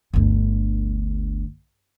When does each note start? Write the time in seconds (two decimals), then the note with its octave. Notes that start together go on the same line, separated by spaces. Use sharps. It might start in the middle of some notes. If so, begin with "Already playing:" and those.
0.13 G1 D2